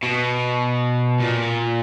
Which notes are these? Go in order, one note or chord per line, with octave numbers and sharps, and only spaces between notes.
B2
A#2